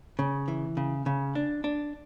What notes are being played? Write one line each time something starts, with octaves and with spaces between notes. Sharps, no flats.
C#3
E3
C#3
C#3
D4
D4